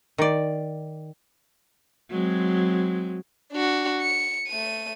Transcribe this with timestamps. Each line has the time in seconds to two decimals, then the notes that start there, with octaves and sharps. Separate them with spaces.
0.18 D#3 D5
2.09 F#3 G#3 C4
3.52 D4 F#4
4.01 C#7
4.48 A3 D#7